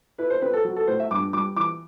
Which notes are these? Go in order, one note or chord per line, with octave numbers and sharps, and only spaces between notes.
E4 B4
C5
C4 B4
A4
F#3
A4
A2 C5
E5
G2 D6
G3 D6
E3 D6